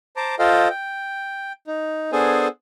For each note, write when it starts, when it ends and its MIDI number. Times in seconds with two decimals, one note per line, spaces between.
0.16 0.35 72
0.16 0.35 81
0.16 0.35 82
0.16 0.35 86
0.39 0.68 65
0.39 0.68 69
0.39 0.68 72
0.39 0.68 75
0.39 0.68 77
0.39 0.68 79
0.70 1.52 79
1.67 2.11 63
2.12 2.48 59
2.12 2.48 62
2.12 2.48 68
2.12 2.48 69
2.12 2.48 72
2.12 2.48 80